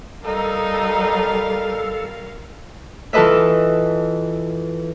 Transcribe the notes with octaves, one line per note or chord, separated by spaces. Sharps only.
G3 D#4 A4 A#4 F5
E3 F4 A4 B4 D#5 E5